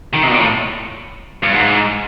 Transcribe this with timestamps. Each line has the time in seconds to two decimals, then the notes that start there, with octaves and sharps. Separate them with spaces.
0.14 D#3
0.23 C3
0.27 B2
0.31 A#2
0.39 A2
1.43 G2
1.53 G#2